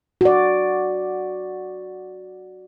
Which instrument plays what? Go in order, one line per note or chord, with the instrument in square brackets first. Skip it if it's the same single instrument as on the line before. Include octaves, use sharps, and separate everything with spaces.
[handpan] F#4 D5